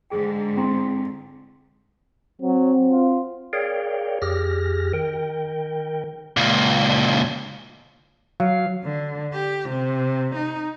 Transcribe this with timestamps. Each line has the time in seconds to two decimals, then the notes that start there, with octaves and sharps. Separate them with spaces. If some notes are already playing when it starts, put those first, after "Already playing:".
0.10 G#2 D3 G#4 G5
0.57 C4 E4 A#5 C6
2.42 F#3 C4
2.91 F4
3.53 G#4 A#4 C#5 D5 F5 G5
4.22 F2 G4 G#4 F6 A#6
4.93 D#3 A#4 G5
6.37 C#2 A#2
8.40 F#3 F5
8.84 D3
9.33 G4
9.69 C3
10.35 D#4